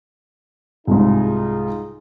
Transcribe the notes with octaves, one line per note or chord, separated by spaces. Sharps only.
C2 G#2 D#4 F4 G#4